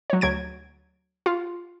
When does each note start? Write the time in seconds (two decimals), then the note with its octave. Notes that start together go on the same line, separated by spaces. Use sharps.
0.10 F#3 C#5
0.21 D2 F#3 G#6 D7
1.26 F4